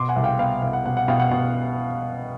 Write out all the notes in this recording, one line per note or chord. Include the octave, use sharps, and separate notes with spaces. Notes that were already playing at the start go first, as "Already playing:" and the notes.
Already playing: B2 C6 D6
F#5 G#5
C2
F5 G5
B3 F5 G5
C2 F5
F#5
B2 F#5
F#5
B2 F5 G5
F#5
B2